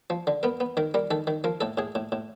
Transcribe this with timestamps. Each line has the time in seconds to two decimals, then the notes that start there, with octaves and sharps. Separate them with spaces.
0.10 F3
0.27 D3
0.43 B3 A#4
0.60 B3
0.77 D#3 A#4
0.94 G3 A#4
1.11 D#3 A4
1.27 D#3
1.44 F3 A#4
1.61 A2 A4
1.77 A2 G#4
1.95 A2
2.12 A2